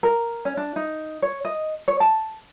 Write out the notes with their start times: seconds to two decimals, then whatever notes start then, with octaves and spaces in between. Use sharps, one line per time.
0.03 A#4
0.45 C#4
0.57 D4
0.76 D#4
1.22 C#5
1.45 D#5
1.88 C#5
2.00 A5